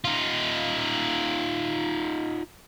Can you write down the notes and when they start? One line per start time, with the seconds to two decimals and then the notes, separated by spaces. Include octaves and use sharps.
0.04 D#4 F4